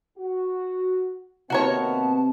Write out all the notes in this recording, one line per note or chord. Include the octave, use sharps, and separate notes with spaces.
F#4
C3 D#3 A#3 B3 F#4 A#4 C#5 A5